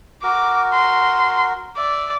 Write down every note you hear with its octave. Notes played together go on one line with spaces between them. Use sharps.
F#4 A#4 D6
C6
D5 E5